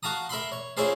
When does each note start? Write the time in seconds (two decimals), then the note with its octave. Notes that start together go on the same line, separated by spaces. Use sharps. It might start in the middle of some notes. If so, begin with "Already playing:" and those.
0.03 F#4 F5 A5 A#5 D#6
0.29 A#4 E5 B5 C6
0.52 C#5
0.77 C#4 E4 F4 G#4 A#4 C5